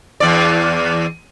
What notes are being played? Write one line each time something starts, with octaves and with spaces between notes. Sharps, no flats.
E2 D5